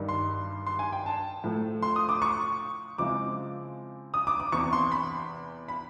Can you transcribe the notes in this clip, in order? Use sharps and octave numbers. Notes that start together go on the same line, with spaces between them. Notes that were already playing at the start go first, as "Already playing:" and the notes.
Already playing: G2 D#3 G3
C6
C6
G#5
G5
A5
A2 F3 A3
C6
D#6
D6
C#6
C#3 F3 G#3 C4 E4 D6
D#6
D6
D6
E2 C3 E3 C#6
C6
B5
B5